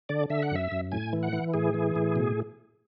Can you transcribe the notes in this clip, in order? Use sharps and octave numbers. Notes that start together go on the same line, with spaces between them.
D3 D5
D3 E5
F#5
F#2 E5
F#2
A2 G#5
E3
F#5
E3
A2 G#4
E3
A2
B2